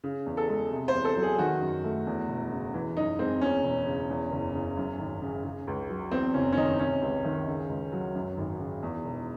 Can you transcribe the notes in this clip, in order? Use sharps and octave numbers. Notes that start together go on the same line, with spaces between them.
C#3
E2
A4
G#3
C3
C5
E2
A4
F#3
G#4
D#3 F#4
F#2
A3
E2
E1
C#3
E3
F#2 D#4
G#3 C4
E2 C#4
E1
C#3
E2
F#1
C#3
F#2
G#1
C#3
C#3
C#2
F#3
E2 C4
F#1 C#4
C#4
D#3 D#4
C3 C#4
C#2
D#3
C#3
C#2
F#3
F#2
G#1
C#3
E2
E1